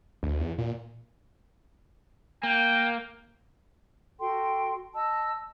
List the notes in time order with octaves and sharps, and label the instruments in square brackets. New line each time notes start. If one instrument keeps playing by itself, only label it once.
[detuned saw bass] D2
E2
A#2
[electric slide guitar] A#3 [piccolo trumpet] G5
[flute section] F#4 A4 G5 C6
D#5 A5 E6